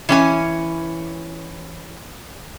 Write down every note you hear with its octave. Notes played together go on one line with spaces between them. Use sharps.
E3 C#4 G#5